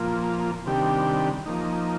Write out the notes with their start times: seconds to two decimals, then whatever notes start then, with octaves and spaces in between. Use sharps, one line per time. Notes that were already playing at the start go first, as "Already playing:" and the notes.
Already playing: A#2 F3 A#3 F4
0.66 C3 D#3 G3 D4 G4
1.46 F3 A#3 D#4